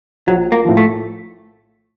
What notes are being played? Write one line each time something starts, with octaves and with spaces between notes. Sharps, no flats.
A#1 F#3
A#3
A2 F3
A3